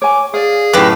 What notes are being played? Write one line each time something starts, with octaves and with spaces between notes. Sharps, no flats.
C#5 G#5 D6
G#4 D5 F5
F#2 A2 G4 B4